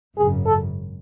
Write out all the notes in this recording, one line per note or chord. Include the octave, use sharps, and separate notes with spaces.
G#1 F#2 C#3 G#4
A4